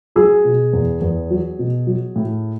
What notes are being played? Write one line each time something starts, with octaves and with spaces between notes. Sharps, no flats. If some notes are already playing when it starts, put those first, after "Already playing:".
F#3 G#4
B2
E2
E2
F#3
B2
F#3
A2